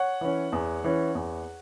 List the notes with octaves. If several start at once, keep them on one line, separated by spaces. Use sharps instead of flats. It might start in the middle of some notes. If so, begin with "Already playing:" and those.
Already playing: C#5 F#5
E3 C#4
E2
E3 C#4
E2